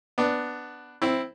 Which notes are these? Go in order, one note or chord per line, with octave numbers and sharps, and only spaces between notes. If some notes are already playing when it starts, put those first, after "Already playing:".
B3 D4
C4 E4